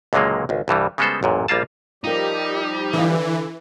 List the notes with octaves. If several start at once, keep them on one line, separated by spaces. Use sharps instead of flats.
C#2 A#2 D3 F#3 G#3 A#3
G#1 C#2
C2 G2 E3 G3
C#3 G3 G#3 B3 A4 C5
A1 F#2 A#2
A#1 G3 A#3 F4 A5
F3 G3 D#4 F4 G4 A#4
D3 E3 F5